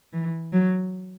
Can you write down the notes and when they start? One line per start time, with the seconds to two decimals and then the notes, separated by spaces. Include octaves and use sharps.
0.13 E3
0.53 F#3